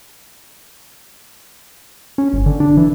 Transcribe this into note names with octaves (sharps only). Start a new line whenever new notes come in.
C#4
G1
D3
D4
E3